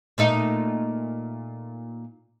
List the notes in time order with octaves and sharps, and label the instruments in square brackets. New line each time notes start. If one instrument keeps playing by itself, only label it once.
[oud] A#2 A3 D#4